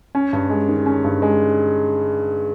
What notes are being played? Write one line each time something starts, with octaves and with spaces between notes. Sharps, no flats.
C#4
G2
G#3
D#3
C#4
G2
G#3